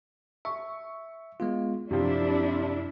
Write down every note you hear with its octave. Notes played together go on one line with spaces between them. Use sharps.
E5 C#6
G#3 B3 F4
F#2 C3 F3 D4 E4